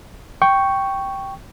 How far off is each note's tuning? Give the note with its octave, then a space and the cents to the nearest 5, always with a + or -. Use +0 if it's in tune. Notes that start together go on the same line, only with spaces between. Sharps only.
G5 -5 C#6 +0